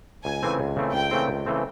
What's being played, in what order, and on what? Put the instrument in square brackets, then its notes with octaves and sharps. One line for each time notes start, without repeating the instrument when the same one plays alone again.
[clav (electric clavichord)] C#2 [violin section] G#5
[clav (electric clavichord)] C#3 E3 A3 C4
C#2
C#3 E3 A3 C4
[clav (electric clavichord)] C#2 [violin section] G5
[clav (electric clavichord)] C#3 E3 A3 C4
C#2
C#3 E3 A3 C4